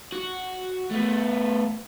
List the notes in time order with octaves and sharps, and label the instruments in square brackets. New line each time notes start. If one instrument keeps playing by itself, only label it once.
[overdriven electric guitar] F#4
A3 B3